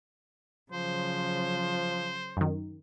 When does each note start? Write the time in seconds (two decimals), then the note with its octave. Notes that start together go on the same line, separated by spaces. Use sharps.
0.72 C#3 F3 F#3 C5
2.37 F#2 D#3